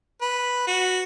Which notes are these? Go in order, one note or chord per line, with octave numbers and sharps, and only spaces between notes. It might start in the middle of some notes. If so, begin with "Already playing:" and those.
B4
F#4